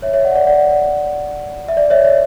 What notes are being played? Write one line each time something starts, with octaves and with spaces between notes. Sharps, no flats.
C#5 E5
C#5 E5
D5 F#5
D5 F#5
D5 F#5
E5
D5
C#5 E5
C#5